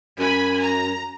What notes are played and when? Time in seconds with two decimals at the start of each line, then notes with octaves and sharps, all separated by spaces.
0.19 F#2 G#5 B5
0.62 A#5